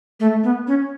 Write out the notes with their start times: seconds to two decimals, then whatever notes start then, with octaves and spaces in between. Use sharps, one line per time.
0.20 A3
0.44 B3
0.67 C#4